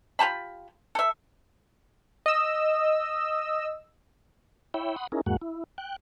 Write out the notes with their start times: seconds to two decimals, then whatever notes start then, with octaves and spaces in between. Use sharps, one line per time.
0.19 F4 G4 A5 B5
0.95 A4 E5
2.26 D#5 E6
4.74 E4 C#5 E5 G5 B5
4.96 F#5 B5 C6 D#6
5.12 C#4 D#4 E4 G#4 A#4
5.26 E2 G#2 G#3 A#3 F#4 F#5
5.42 E4
5.78 G5 F#6